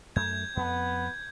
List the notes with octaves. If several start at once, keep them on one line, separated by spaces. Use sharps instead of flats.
F#2 A3 G6 G#6
F2 B3